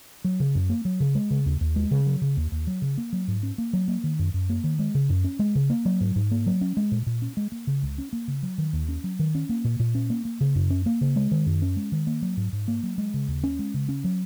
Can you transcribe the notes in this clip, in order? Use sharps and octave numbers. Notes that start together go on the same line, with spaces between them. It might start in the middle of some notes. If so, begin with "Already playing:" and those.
F#3
C#3
F#2
A#3
F#3
C#3
G#3
C#3
D#2
D#2
G#3
C#3
F#3
C#3
D#2
D#2
F#3
C#3
A#3
F#3
G#2
C#4
A#3
F#3
A#3
D#3
F#2
F#2
A#3
D#3
G#3
C#3
F#2
C#4
G#3
C#3
A#3
F#3
G#2
G#2
A#3
F#3
C#4
G#3
A#2
A#2
C#4
G#3
A#3
C#3
C#2
C#4
A#3
C#3
F#3
D#3
D#2
C#4
F#3
D#3
C#4
A#3
A#2
A#2
C#4
A#3
A#3
C#3
F#2
C#4
A#3
C#3
G#3
D#3
F#2
C#4
G#3
D#3
A#3
F#3
G#2
G#2
A#3
F#3
G#3
C#3
D#2
C#4
G#3
C#3
C#4
F#3